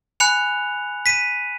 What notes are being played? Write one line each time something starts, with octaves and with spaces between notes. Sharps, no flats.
G#5 B5 F#6 C#7 F7
B6 D#7